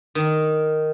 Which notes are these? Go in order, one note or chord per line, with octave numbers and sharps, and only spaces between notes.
D#3